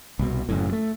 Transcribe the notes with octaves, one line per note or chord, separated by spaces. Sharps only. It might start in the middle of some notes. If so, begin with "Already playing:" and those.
C2 B2
F#1 F#2 A2
A3